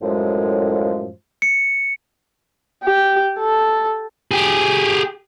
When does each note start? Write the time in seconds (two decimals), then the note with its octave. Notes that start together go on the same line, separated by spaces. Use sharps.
0.02 F#2 A2 F3 G#3
1.42 C#7
2.84 G4
3.39 A4
4.31 G4 G#4